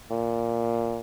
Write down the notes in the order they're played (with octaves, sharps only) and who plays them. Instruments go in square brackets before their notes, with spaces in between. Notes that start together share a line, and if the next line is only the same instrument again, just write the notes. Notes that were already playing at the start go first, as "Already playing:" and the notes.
[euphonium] A#2